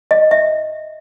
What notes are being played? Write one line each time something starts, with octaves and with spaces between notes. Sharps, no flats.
D#5
E5